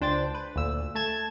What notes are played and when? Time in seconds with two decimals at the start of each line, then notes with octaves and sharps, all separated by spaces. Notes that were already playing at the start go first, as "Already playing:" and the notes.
0.01 C#2 D4 C5 G5 A6
0.34 B4
0.56 D2 A#2 E6
0.95 A3 A5 G#6 E7